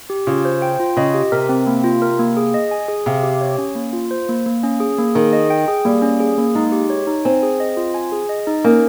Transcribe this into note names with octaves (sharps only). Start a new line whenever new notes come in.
G4
C#3 F4
C5
G5
F4
C#3 D#5
G4
C3 A#4
C4
A#3
F4
A#4
A#3
G#4
D#5
G#5
G#4
C3 F5
G4
C#5
C#4
A#3
F4
C5
A#3
A#3
C#4
G#4
A#3
D#3 G#4
D#5
G5
G#4
G3 A#3
C#4
G#4
A#3
G#3 D#4
G4
C#5
D#4
C4 G#5
G#4
D#5
F4
G#5
G#4
D#5
D#4
A#3 C#4